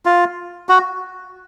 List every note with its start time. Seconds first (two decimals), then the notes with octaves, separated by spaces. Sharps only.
0.05 F4
0.69 F#4